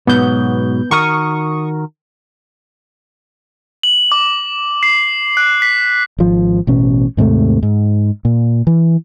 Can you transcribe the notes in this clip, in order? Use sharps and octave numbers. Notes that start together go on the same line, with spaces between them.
G#2 B2 F#3 B3 G6
D#3 F#4 A#4 C#6 D#6
F#7
D6
C7
F#6
B6
G#1 F3
A1 B2 C#4
D#2 G#2 C3 A3
G#2
A#2
E3